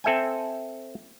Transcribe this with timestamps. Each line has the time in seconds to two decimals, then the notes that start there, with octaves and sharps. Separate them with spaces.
0.04 C4 A4 E5 G5 G#5